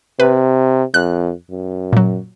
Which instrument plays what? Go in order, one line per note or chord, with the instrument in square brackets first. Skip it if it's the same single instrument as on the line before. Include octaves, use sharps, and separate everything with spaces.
[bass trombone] C3 [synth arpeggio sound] B4
[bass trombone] F2 [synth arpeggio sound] F#6
[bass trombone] F#2
[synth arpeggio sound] A#2 F#3